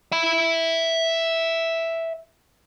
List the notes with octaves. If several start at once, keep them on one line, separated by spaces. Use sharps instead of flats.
E5 B5